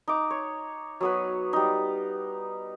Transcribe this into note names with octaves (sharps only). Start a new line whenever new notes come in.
D#4 D6
C#5
F#3 B3 B4
G3 D#4